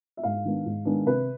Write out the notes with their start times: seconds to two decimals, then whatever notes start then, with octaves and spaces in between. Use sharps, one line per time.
0.17 E5
0.23 G#2 F5
0.45 D#3 G#3 B3 D4
0.66 G#2
0.85 D#3 G#3 B3 D4
1.06 C3 B4